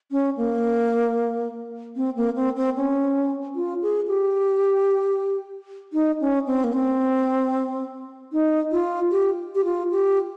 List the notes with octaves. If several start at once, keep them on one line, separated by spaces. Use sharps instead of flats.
C#4
A#3
C4
A#3
C4
C4
C#4
F4
G#4
G4
D#4
C#4
C4
A#3
C4
D#4
F4
G4
G4
F4
G4